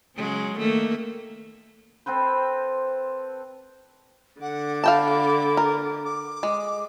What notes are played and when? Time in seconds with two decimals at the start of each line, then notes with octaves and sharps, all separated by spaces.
0.17 C#3 F#3 G#3
0.57 D#3 A3 A#3
2.06 C4 A4 B4 C5
4.42 D3 F#5 D6
4.84 F5 G5 A5 B5
5.57 A#4
6.05 D6
6.43 G#3